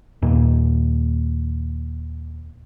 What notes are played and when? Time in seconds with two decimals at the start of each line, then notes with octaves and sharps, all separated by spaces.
0.22 D#2 A#2